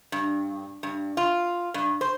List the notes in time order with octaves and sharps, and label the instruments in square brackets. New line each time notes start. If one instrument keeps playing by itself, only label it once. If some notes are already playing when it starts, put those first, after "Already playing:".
[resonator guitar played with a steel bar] G2
G2
F4
G2
C5